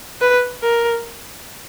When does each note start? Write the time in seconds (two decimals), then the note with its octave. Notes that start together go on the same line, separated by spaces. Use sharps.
0.21 B4
0.63 A#4